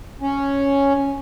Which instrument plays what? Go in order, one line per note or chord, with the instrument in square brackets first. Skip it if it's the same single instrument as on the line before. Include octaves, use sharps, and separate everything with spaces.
[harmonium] C#4